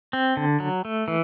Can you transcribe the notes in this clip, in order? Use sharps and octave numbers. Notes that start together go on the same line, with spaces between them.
C4
D3
F#3
A3
E3